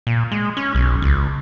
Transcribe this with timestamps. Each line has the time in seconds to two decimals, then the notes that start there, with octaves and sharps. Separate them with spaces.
0.07 A#2
0.31 G#3
0.57 C#4
0.75 B1
1.02 C#2